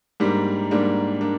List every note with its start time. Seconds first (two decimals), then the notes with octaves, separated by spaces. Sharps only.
0.20 G#2 G3 A#3 D4
0.71 G#2 G3 A#3 D4
1.21 A#3 D4